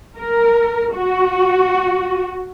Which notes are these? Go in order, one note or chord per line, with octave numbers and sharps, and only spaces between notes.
A#4
F#4